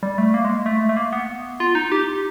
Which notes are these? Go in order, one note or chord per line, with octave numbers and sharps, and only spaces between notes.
G3
A3
A#3
G#3
A3
A3
A#3
B3
F4
D#4
G4